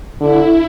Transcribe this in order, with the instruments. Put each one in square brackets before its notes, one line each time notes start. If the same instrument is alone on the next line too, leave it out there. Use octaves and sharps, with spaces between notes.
[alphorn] D3 [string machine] E4